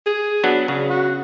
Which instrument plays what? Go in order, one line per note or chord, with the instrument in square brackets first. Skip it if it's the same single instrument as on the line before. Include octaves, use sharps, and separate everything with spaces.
[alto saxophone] G#4
[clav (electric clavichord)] F#3 B3 D4
C#3
[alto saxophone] F#4